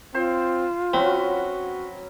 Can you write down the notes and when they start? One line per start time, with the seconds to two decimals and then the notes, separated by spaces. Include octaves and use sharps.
0.14 C4 F4 C5 C6
0.94 F#3 C4 C#4 F#4 B4